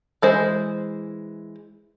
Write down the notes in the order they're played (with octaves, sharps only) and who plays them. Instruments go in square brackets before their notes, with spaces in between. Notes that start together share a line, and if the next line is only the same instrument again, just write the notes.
[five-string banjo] E3 G#3 C5